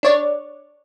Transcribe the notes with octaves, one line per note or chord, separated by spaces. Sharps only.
D4 C#5 D5